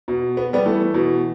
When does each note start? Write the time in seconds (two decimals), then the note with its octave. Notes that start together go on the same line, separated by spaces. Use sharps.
0.08 B2
0.37 B3
0.53 G3 B3
0.66 E3 A3
0.94 B2 E3